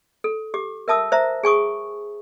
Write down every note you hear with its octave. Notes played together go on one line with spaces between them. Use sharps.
A4
G4 D6
A#4 E5 A5 D#6 E6
C5 E5 A#5
G#4 G#5 C#6 D#6